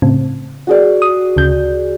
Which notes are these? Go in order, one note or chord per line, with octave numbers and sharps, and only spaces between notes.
A2 C#3 C4
F#4 G#4 D5
D#6
D2 C#3 G6